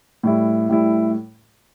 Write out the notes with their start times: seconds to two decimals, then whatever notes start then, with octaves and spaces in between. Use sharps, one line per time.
0.23 A2 G3 E4
0.69 A2 G3 E4